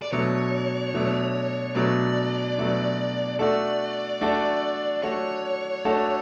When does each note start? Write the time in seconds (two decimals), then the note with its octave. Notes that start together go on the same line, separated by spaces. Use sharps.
0.02 D5
0.12 B2 F#3 A3 D4 C#5
0.94 B2 F#3 A3 D4
1.76 B2 F#3 A3 D4 D5
2.57 B2 F#3 A3 D4
3.39 A3 D4 F#4 A4 D5
4.21 A3 D4 F#4 A4
5.02 A3 D4 F#4 A4 C#5
5.85 A3 D4 F#4 A4